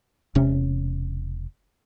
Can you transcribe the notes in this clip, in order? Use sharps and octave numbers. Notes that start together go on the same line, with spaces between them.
E1 C3 C#4